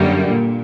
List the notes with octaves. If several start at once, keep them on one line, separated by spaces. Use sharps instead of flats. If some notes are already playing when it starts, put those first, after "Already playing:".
Already playing: F#2 D3 G3 A#3
A#2